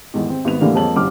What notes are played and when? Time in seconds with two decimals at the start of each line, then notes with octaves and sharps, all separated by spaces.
0.14 E2 G#2 D#3
0.29 C4
0.45 G#1 B3 F7
0.60 A2 D3 E3 G3 A#3 B3
0.75 F2 G#3 A#3 C#5 A5 F#7
0.96 F#1 F#2 F#3 G4 D6 F6